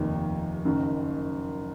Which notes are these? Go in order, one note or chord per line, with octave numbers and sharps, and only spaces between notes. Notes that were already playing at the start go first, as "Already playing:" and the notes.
Already playing: F1 D#2 D#3 A#3
F#1 F#2 D#3